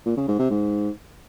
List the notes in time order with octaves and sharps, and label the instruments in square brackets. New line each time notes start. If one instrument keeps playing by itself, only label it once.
[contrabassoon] A#2
C#3
G#2
C3
G#2